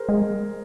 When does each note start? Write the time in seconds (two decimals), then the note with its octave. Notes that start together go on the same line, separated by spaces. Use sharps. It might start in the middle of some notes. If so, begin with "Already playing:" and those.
Already playing: G#4 A#4 C5
0.09 G#3